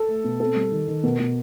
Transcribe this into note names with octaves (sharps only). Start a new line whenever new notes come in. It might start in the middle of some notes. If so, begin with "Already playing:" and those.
Already playing: A4
A3
B2
C4 A4
G3
D#3
D#3
B2 A#4
B2